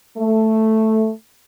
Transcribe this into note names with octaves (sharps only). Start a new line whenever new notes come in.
A3